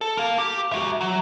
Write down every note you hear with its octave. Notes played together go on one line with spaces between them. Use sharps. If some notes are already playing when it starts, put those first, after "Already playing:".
A4
A#4 F5
G4
F#4 E5
F#3